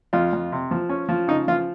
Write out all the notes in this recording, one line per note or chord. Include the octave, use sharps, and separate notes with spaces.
F2 F4
F2
C3
F3
C#4
F3
C#3 D#4
F3 F4